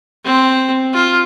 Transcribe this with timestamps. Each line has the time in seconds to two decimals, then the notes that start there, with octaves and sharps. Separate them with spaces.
0.25 C4
0.94 F4